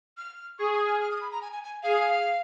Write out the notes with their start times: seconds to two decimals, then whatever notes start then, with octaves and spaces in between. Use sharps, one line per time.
0.17 F6
0.59 G#4 C#6
0.73 D#6
0.87 F6
1.01 F6
1.11 D#6
1.21 B5
1.31 A#5
1.42 G#5
1.52 G#5
1.63 G#5
1.83 G#4 F5